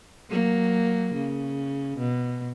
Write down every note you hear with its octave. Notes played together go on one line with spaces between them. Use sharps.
F#3 A#3
C#3
B2